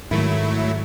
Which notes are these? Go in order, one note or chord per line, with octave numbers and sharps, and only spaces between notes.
G#2 D#3 F#3 A3 E4